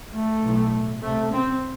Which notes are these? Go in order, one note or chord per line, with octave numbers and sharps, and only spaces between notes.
A3
B1 A2
C2 C3 A3
C4